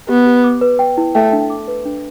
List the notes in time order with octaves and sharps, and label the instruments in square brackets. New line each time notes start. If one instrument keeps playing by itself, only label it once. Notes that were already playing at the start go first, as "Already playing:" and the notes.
[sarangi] B3 [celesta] G4
[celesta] G4
D6
B4
G5
E4
[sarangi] A3 [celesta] G5
[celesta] D4
D6
B4
D4